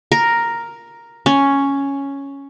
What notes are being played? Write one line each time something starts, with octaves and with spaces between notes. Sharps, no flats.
A#4
C#4